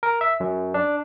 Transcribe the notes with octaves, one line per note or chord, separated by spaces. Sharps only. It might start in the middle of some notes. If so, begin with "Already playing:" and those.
A#4
E5
F#2
D4